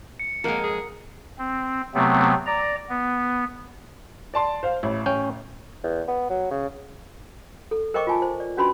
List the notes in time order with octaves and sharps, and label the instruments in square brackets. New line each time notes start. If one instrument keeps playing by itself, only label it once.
[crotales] C#7
[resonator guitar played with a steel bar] F2 G#3 [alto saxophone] A#3 [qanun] A#4 F#5
[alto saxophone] G#4
[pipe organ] C4
C3 F#3 A3 B3 C4
D5 A#5
B3
[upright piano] D5 A5 C6
C5 F5
[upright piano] A1 [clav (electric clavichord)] E4
[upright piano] A1 [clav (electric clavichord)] C#4 G5
[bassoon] E2
B3
F#3
C#3
[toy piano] A4
A#4 C5 D#5 G5 C#6 D6
F4 G#5 A5
C5
D5
C#4 D4 F#4 B4 B5 C6